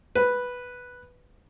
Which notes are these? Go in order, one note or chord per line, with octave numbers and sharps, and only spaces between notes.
B4